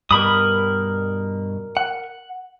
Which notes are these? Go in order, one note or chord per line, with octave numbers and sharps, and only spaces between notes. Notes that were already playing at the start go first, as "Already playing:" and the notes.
G2 B2 A#4 B5 D#6
F#5